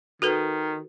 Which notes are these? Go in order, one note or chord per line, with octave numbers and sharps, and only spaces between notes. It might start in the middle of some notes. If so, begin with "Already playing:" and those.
D#3 F#4 A4 B4